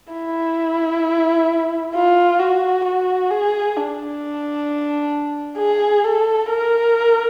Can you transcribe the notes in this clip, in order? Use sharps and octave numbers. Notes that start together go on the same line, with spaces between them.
E4
F4
F#4
F#4
G#4
D4
G#4
A4
A#4